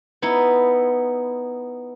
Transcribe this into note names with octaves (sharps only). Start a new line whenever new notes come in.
B3 D#4 E4